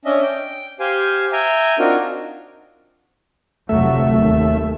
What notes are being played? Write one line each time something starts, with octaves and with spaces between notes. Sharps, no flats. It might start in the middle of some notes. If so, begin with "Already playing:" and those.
C#4 D4 D#5 E5
G5
G4 C5 F5 G#5
E5 G5 G#5 A#5
C4 D4 D#4 F4 F#4 A#4
F1 D2 F#3 A3 E5
D#2